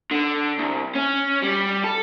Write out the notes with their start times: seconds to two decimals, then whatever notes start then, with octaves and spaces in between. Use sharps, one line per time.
0.11 D3
0.58 C2
0.95 C#4
1.42 G3
1.84 A4